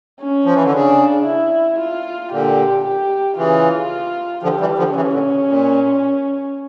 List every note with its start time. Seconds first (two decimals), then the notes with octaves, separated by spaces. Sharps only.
0.20 C#4
0.45 F3
0.54 E3
0.64 D3
0.73 C#3 D4
1.26 E4
1.78 F4
2.31 A#2 D3 G4
2.84 G4
3.37 C#3 E3 F4
4.43 D3 F3 G4
4.60 E3 G3
4.78 D3 F3
4.96 C#3 E3 C#4
5.13 A#2 D3
5.31 C#3
5.48 A#2